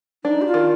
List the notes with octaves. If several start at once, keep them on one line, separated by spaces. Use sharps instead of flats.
D4 D#4
G4
F4
D#3